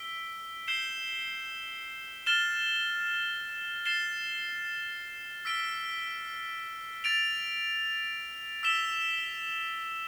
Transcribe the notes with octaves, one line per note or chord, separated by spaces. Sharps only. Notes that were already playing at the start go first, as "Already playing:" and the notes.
Already playing: E6 B6 D7 G7
G6 C7 E7 G7
F6 A6 E7 G7
A6 C7 E7 G7
E6 B6 D7 G7
A6 D7 F7
E6 B6 E7 G7